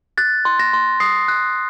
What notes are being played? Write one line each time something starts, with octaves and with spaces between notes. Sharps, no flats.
F#6 A6
C6
A#6
C6
D#6 C7
F#6